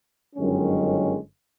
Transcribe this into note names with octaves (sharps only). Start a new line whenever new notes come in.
G1 F#2 D#3 G#3 C#4